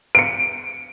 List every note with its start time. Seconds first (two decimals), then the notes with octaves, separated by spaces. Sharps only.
0.15 C#7 D7